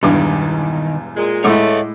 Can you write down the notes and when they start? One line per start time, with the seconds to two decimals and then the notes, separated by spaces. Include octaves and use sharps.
0.03 E1 E2 G2 D#3 D6
1.16 A#2 G#3
1.44 A2 G#3 A3 C#5 D#5 F#5 D6